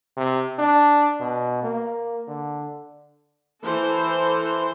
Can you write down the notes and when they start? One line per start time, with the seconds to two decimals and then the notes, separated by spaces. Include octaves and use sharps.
0.17 C3
0.59 D4
1.20 B2
1.63 A#3
2.28 D3
3.64 E3 A4 C5 C6